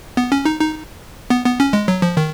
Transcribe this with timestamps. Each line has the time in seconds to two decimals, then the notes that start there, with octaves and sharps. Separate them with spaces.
0.17 B3
0.32 C#4
0.45 D#4
0.60 D#4
1.30 B3
1.46 B3
1.60 C#4
1.73 G#3
1.88 F#3
2.02 F3
2.17 D#3